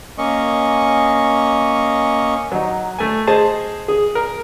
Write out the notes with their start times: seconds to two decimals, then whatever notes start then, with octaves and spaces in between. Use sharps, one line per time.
0.18 A#3 C#4 D#5 C#6
2.52 F#3 D#4
2.99 A3 G#5
3.27 G#4 C5 D#5 A5
3.88 G#4
4.15 A#4